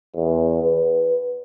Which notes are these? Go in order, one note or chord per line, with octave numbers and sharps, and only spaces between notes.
E2
B4